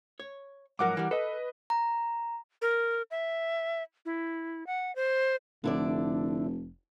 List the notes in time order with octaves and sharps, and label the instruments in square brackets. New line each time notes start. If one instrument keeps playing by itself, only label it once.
[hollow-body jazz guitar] C#5
[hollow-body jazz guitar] G#2 F3 F#3 [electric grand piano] A#4 F#5 D6
[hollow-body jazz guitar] E3 G3
[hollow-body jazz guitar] A4 [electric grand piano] B4 D#5
[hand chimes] A#5
[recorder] A#4
E5
E4
F#5
C5
[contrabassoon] F1 [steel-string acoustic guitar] D3 E4 D5